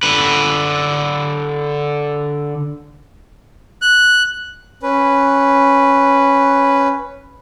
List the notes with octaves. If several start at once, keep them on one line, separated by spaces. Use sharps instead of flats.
D3 B4
F#6
C#4 B4